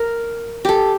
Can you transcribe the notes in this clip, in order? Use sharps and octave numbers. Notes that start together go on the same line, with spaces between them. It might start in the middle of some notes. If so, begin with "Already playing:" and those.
Already playing: A#4
G4 A4